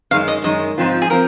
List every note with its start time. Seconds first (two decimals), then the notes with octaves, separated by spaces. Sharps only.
0.11 F#2 D#3 G#3 F5
0.28 D#5
0.44 F#2 D#3 G#3 D#5
0.78 G#2 F3 C4 F4
1.02 G#4
1.10 F3 C4 A#4